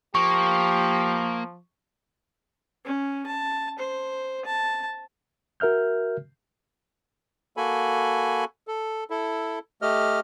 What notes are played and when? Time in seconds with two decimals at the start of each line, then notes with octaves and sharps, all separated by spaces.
0.15 F3 A#3 G4 C#6
2.85 C#4
3.27 A5
3.79 C5
4.46 A5
5.60 F#4 A#4 E5 F6 G6
7.57 A#3 F#4 A4 G#5 B5
8.67 A4
9.10 E4 A4
9.82 A3 G4 D#5 F6